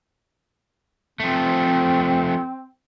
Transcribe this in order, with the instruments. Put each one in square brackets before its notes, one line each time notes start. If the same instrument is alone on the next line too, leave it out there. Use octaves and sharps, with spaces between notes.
[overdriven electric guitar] F3 A3 [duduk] C4